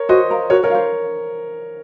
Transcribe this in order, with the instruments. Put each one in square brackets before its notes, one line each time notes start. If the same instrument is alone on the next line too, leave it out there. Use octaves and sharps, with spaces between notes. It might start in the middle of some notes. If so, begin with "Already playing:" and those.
Already playing: [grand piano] A#4 C#5
[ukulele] F#4 [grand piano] C5 D#5
[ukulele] A#4 F5 A#5
[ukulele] F#4 [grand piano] A#4 C#5
[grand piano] A#4 C#5
[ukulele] C5 F5